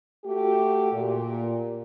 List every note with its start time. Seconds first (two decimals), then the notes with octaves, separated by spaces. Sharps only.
0.25 A3 F#4 G4
0.92 A#2